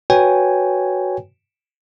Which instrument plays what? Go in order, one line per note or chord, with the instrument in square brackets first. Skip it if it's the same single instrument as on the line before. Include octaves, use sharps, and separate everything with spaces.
[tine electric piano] F#4 B4 C#5 G5 G#5